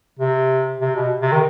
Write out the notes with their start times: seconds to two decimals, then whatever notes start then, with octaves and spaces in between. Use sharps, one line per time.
0.19 C3
0.81 C3
0.96 B2
1.21 C3
1.32 D#3